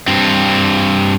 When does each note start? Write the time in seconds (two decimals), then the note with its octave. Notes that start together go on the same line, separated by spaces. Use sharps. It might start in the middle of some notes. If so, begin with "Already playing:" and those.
0.08 G2 C4